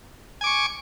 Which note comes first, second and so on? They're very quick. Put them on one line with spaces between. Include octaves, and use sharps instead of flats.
G#5 D6 C#6